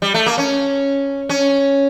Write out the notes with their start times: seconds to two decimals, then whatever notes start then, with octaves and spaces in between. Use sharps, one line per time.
0.02 G3
0.14 A3
0.26 A#3
0.38 C#4
1.29 C#4